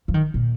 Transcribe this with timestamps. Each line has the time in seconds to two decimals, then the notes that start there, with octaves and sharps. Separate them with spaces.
0.08 F3
0.14 D#3
0.34 A#2